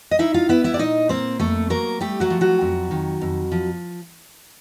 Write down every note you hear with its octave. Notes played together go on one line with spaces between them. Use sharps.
D#5
D#4 E4 E5
F4 F5
B3 E4 E5
E4 E5
D5
A#2 D#4 D#5
A#3 C4 C5
F2 A3 A4
F#3 A#3 A#4
G3 A3 G4
F#3 F#4
F3
F#3 F#4
F2
D#3
F2
F3